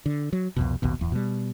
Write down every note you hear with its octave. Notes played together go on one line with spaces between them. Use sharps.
D3
F#3
C2 F2 B2
A1 D#2 B2
D1 E2
B2 G3